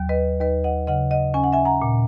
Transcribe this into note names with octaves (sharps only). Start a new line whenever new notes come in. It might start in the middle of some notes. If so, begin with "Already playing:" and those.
Already playing: D#2 F#3
B4 D#5
D#2 B4 D#5
D#5 F#5
C#3 D#5 F#5
D#5 F#5
C#4 G#5
F#5
E5 G#5
F#5 A#5
A#2